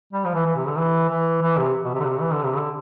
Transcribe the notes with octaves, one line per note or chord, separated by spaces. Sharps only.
G3
F3
E3
E3
C3
D3
E3
E3
E3
C3
B2
C3
D3
C3
E3
D3
C3
D3